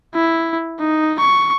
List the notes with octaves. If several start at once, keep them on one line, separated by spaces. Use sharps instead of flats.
E4
D#4
C#6